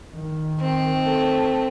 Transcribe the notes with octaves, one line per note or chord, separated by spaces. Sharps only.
D#3
C4
A3